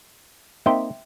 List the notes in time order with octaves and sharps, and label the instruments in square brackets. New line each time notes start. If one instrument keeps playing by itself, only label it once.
[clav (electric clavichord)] A#3 C4 D#4 [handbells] E5 G5 C6